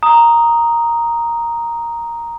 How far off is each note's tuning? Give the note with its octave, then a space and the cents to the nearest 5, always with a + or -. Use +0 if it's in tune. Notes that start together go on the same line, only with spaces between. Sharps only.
A#5 +0 D#6 +0